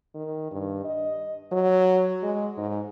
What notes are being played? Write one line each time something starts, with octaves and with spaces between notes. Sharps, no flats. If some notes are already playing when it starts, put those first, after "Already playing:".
D#3
G2
D#5
F#3
G#3
G#2